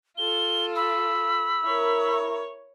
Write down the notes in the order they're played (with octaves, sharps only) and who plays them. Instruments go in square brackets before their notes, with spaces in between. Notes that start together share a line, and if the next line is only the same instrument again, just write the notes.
[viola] F4 A4 [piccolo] G7
[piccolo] B5 [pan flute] E6
[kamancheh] E4 A#4 [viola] C#5